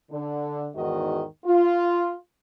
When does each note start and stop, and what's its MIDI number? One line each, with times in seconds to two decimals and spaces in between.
0.11 0.69 50
0.75 1.24 40
0.75 1.24 44
0.75 1.24 51
0.75 1.24 66
0.75 1.24 75
1.45 2.14 65